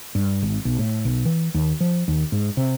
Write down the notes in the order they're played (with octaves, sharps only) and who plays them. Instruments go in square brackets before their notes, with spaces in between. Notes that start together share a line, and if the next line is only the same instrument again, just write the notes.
[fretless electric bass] G2
G#1
B1
A2
B1
E3
D#2
F3
D#2
G#2
C3